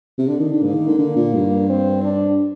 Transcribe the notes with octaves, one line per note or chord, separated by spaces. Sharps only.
C3
D3 D4
D#3
D3
G#2 A#3
D#3
D3
D3
A#2
G2
C4
D4